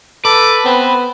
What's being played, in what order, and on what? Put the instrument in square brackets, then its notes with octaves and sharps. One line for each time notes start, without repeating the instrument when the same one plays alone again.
[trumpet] A4 [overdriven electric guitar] B4 [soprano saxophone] D6
[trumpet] B3 [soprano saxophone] C4